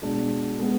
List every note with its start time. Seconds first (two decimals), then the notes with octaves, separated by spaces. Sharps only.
0.02 B2 G#3 D4
0.59 G#3 B3